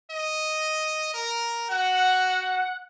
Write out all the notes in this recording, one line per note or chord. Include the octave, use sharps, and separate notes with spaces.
D#5
A#4
F#4 F#5